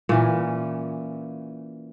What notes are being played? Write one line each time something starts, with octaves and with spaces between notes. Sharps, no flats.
A#2 E3 C#4